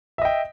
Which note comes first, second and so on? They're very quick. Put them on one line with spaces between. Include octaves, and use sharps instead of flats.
E5 D#5 G5